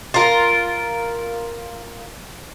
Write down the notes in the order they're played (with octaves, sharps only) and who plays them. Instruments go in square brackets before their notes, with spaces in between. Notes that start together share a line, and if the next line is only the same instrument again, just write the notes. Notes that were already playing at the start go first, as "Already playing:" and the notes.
[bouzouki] F4 A#4